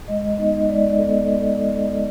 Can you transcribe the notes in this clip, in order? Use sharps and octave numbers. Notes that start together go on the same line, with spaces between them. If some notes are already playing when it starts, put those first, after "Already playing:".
G#3 D#5
B3 D#4 D#5
G#3 D5
B3 D#4 A4